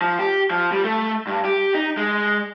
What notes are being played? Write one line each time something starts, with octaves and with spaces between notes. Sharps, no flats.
F3
G4
F3
G3
A3
G2
G4
D#4
G#3